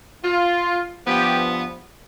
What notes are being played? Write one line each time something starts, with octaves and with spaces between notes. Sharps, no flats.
F4
G2 F3 B3 G4